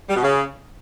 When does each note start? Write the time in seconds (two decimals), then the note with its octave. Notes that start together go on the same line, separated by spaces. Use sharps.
0.09 G3
0.16 B2
0.23 C#3